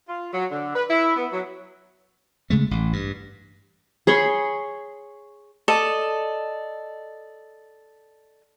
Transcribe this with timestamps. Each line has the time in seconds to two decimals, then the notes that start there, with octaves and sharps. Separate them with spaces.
0.08 F4
0.33 F#3
0.51 D3
0.74 B4
0.89 E4
1.16 B3
1.32 F#3
2.50 C#3 G#3 A3
2.71 A1
2.93 G2
4.07 G#4 C#5 B5 C6
5.68 A4 D5 D#5